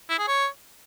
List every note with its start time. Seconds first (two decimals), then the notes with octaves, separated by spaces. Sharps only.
0.10 E4
0.19 G#4
0.28 C#5